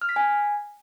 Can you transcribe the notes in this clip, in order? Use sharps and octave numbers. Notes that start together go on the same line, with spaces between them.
F6
B6
G#5